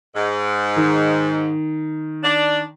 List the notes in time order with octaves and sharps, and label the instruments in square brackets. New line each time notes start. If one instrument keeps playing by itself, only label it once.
[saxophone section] G#2
[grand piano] D#3
[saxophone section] D4